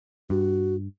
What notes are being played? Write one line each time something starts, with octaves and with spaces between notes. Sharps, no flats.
G2 F#4